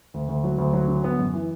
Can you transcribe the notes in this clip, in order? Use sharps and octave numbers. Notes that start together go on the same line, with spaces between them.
D2
D2
F#3
D2
F#3
D3
B3
F#2
E3